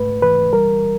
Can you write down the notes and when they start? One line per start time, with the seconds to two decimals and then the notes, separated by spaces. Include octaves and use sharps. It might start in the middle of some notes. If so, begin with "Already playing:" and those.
Already playing: G#2 A3 B4
0.22 E3 B4
0.53 G3 A#4